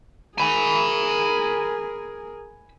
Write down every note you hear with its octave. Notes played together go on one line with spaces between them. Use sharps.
G#4 A#4 G#5 B5